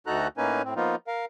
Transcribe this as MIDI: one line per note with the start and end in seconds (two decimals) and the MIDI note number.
0.07 0.28 38
0.07 0.28 63
0.07 0.28 66
0.07 0.28 69
0.07 0.28 82
0.07 0.28 90
0.37 0.62 45
0.37 0.62 58
0.37 0.62 61
0.37 0.62 63
0.37 0.62 71
0.37 0.62 80
0.64 0.74 45
0.64 0.74 60
0.76 0.96 53
0.76 0.96 58
0.76 0.96 59
0.76 0.96 63
0.76 0.96 65
1.07 1.25 70
1.07 1.25 77